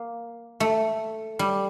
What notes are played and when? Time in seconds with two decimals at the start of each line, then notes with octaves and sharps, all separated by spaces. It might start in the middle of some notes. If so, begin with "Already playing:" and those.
Already playing: A#3
0.60 A3
1.39 G3